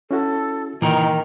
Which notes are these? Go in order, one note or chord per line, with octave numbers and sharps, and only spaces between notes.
C#4 E4 F#4 A4
A#2 D#3 E3 A#4 A#5